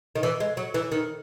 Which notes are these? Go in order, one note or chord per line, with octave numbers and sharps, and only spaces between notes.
D#3
E3
G#3
F#3
E3
D#3